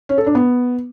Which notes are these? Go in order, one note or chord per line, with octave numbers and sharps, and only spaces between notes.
C#4
A4
D4
B3